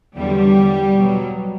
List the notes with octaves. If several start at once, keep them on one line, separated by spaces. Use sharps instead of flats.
E2 D3 F#3 G3
B2 F#3